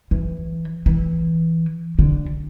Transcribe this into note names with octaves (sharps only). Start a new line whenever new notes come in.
E3
E3
D3